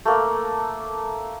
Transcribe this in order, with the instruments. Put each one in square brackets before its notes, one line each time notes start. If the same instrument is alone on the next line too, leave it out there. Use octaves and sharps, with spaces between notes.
[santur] A3 A#3